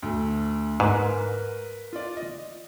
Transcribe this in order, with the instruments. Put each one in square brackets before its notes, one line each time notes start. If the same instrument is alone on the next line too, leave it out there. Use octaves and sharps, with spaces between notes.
[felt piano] D2 A3
[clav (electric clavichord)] G#2 [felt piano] A#4 B4
[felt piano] F4 D5
D#5